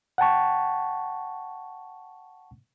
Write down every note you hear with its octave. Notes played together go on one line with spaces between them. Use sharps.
F#5 G5 A5 C#6